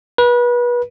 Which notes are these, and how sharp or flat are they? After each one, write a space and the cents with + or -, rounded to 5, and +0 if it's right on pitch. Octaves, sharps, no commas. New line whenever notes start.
B4 -30